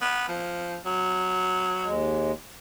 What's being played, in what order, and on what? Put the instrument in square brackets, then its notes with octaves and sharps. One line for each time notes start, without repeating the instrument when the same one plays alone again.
[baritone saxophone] B3
F3
F#3
[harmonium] D#2 G#3